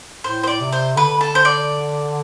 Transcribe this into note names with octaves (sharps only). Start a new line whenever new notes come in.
A2 C5
C5
D5
C3
C5
D3 B4
A4
C5
D5